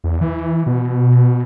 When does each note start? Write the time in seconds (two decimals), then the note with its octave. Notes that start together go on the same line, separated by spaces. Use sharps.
0.04 E2
0.21 E3
0.66 B2